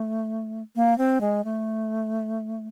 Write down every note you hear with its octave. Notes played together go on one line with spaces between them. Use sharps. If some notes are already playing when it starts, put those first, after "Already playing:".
Already playing: A3
A#3
C4
G#3
A3